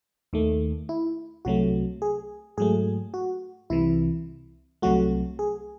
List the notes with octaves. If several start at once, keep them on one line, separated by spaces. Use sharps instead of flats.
D#2 D#3 A3
E4
C2 C3 F#3 A3 F#4
G#4
G#2 F#3 A3 G#4
F#4
C2 C3 E3 E4
C2 C3 F#3 A3 F#4
G#4